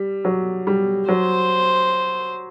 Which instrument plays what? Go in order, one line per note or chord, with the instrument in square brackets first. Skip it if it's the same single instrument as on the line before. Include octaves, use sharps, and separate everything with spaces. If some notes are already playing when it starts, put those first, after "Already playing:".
Already playing: [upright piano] G3
F#3
G3
[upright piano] F#3 [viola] C5